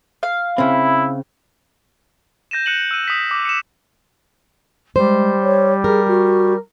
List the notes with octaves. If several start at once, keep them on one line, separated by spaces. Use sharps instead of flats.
F5
C#3 C4 E4
G6 A#6 D#7 E7
F#6 A#6 C#7 D#7 E7 F#7
E6 F#6 D#7
D#6 B6
D6
C#7 E7
G3 G#3 C5
C#5
G#4 A#4
F#4